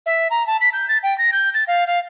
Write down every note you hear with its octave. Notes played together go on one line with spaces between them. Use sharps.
E5
A#5
A5
B6
G6
A6
G5
A#6
G6
A6
F5
F5